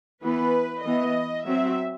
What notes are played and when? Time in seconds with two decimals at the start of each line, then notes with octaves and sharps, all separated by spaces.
0.23 E3 B3 B4
0.84 E3 B3 D#5
1.46 F#3 C4 E5